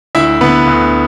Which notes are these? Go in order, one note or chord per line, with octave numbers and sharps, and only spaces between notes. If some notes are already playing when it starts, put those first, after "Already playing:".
D2 E4 E5
D3 B3 B4
D2